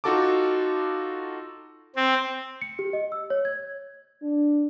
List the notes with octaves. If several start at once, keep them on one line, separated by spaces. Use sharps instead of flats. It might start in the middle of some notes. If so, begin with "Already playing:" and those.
D#4 F4 F#4 A4 A5 D6
C4
C#7
G4
D#5
E6
C#5
G#6
D4